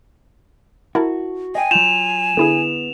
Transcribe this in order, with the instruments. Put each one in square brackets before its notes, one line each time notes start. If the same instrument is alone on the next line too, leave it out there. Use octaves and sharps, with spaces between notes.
[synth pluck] E4 A#4 A5 [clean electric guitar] F#4
[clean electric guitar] D#5 G5 [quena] G#5
[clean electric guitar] F#3 F4 [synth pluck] G6 [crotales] E7 F7
[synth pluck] D3 E4 G#4 [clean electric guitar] B3